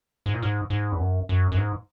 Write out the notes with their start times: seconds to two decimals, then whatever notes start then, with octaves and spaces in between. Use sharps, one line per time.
0.26 G#2
0.34 A#2
0.42 G#2
0.70 G#2
0.92 E2
1.00 F#2
1.29 F#2
1.52 F#2
1.57 G#2